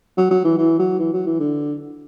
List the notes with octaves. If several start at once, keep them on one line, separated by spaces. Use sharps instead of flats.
F#3
F#3
E3
E3
F#3
E3
F#3
E3
D3